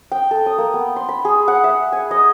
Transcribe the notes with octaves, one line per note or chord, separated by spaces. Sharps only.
G5
A4
D#6
A#3
B3
C6
B5
G#4
F#5
E5
G#5
D#5